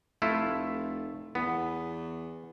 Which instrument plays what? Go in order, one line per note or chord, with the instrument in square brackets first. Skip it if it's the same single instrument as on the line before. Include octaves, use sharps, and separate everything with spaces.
[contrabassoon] F1 [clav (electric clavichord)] A3 E4 F4
[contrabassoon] E2 [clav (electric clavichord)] B3